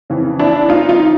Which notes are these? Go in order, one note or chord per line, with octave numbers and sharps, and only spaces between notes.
F2 C#3 E3
D4 E4
D#4 F4
D#4 F4